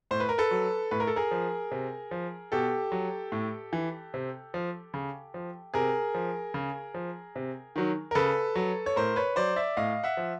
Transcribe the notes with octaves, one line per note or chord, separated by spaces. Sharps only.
A2 C5
B4
A#4
A4 B4
F#3
A2 B4
A#4
A4
G#4 A#4
F3
C3
F3
B2 G4 A4
F#3
A2
E3
C3
F3
C#3
F3
C3 G#4 A#4
F3
C#3
F3
C3
D#3 F#3
A#4
C#3 A4 B4
F#3
C#5
A2 A#4 C5
B4 C#5
F#3 C5 D5
D5 E5
A2 D#5 F5
E5 F#5
F3